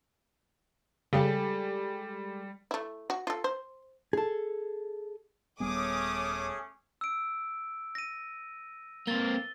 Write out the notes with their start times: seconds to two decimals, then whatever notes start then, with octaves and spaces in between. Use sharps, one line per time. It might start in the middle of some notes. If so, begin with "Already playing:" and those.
1.13 C#3 G3 G#3 G4 A4
2.71 A3 E4
3.10 F#4
3.27 F4 A4
3.44 C5
4.13 G#4 A4
5.60 D#1 G3 A3 B3 C#4 G#4 D6 D#6
7.01 E6 D7
7.95 A#6 D#7
9.07 A#3 C4 A6 G7